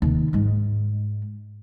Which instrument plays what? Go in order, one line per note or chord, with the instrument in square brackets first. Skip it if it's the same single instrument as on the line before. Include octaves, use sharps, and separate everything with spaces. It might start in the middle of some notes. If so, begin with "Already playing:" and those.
[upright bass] D#2 C3
G#2 G#3